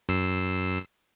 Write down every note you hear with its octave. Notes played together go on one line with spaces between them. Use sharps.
F#2 E6 C7